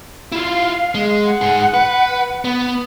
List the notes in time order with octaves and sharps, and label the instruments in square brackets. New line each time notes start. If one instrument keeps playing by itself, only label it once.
[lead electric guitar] E4 F4 [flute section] F5
[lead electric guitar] G#3
[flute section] F#5
[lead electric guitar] G#2 G#4
B4
B3